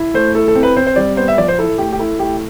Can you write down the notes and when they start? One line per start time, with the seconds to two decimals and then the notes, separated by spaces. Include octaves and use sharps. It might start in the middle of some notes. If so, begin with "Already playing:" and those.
Already playing: E4
0.14 A3 C5
0.35 E4 A4
0.48 A4
0.55 C4
0.63 B4
0.76 C4 C5
0.87 C5
0.96 G3 D5
1.17 B3 C5
1.28 E5
1.37 F3 D5
1.48 C5
1.59 E4 A4
1.78 A3 G4
1.93 G4
1.99 E4 A4
2.19 A3 G4